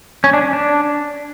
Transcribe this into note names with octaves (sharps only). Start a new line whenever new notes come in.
C#4
D4
D4